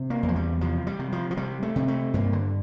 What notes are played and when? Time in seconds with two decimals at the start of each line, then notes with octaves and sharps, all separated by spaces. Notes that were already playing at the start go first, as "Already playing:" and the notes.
Already playing: C3
0.10 A#3
0.23 E2
0.29 F3
0.36 G3
0.61 C3 F3
0.87 G3
0.99 C3
1.12 F3
1.31 F3
1.37 C3 G3
1.63 A3
1.76 C3
1.88 A3
2.14 G2 A#3
2.33 D3